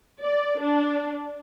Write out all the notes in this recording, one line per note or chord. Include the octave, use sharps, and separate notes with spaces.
D5
D4